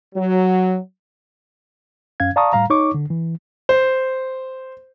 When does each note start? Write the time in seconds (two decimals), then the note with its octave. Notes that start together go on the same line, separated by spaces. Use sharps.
0.15 F#3
2.20 F#2 C#4 F5 G#6
2.36 D5 F5 A5 A#5 C#6 D#6
2.53 A2 G3 F5 A#5
2.70 D#4 C#5 C#6 D6
2.94 D3
3.10 E3
3.69 C5